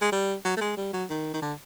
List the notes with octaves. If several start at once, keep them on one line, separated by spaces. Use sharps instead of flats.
G#3
G3
F#3
A3
G#3
G3
F#3
D#3
D#3
D3